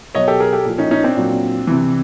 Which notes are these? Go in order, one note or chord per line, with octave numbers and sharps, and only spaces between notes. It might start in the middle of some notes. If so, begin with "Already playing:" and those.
B2 F#3 C#5 D#5
G4 A4
G#4 A#4
G4 A4
A#2 F3
C#4 D#4
C#4 D#4
C4 D4
A#2 F#3
C3 E3